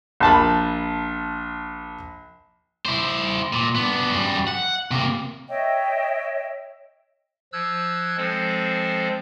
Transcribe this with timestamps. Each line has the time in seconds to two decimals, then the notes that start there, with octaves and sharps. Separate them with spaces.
0.20 A#1 A5 B5
2.85 E4 C5
3.53 A#2
3.75 B3 D4
4.12 F#2 G3
4.47 F#5
4.91 C3 A#3
5.48 C#5 D#5 E5 G5
7.53 F3 E6 F#6 G#6
8.17 F3 G#3 C4 A4 C5